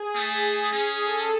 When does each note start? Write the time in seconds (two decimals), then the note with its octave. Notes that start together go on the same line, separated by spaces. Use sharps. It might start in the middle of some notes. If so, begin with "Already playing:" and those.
Already playing: G#4
0.16 A3
0.73 C#4 G#4
1.02 A4